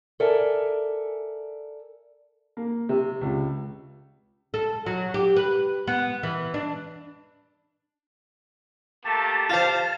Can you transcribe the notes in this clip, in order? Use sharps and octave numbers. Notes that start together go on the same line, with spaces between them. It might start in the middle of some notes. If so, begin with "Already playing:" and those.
A4 A#4 D5 E5 G#5
A#3
C3
C#2
A4
F#3
G4
B4
B3
E3
D4
A3 A#3 G4 A5
G3 F4 C5 F5